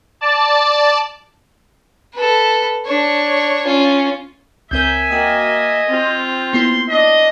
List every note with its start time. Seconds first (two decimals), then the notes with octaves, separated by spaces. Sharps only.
0.21 D5 A5
2.14 A4 B4
2.86 D4 C#5
3.66 C#4 F4
4.71 C#2 C4 A#4 E5 G#5 G6
5.10 A#3 F#4 D#5 G5 D#6
5.88 C4 F4
6.53 A#3 B3 E4 C6
6.90 D4 D#5